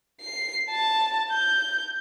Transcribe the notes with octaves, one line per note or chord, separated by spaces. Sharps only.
C7
A5
G6